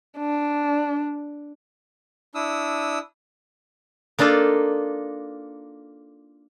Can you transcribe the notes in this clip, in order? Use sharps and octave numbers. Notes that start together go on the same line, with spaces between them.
D4
D4 E4 D#6 E6
A#3 D4 D#4 F4 A4